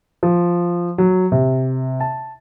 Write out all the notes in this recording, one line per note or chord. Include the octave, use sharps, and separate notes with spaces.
F3
F#3
C3
A5